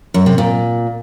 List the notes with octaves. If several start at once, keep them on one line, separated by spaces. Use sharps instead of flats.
F#2
C3
A#2